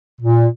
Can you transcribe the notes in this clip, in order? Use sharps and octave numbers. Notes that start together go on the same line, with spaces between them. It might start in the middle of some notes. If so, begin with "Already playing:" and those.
A#2